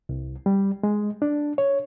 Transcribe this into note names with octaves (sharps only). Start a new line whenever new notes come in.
C2
G3
G#3
D4
C#5